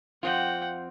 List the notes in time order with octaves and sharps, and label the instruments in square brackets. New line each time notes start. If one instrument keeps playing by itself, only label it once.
[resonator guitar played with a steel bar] F2 C4 F4 [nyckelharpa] F#5 G5